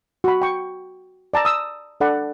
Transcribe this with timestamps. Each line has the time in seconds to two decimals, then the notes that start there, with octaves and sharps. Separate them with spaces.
0.24 F#4 B5
0.42 G5 C#6
1.34 D5 A5 A#5 E6
1.45 D#6 E6
2.00 D4 A4 D5 F#5 B5